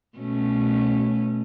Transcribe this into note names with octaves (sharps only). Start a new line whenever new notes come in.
B2 A3 C#4